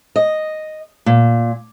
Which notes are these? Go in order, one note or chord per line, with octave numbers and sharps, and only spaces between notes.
D#5
A#2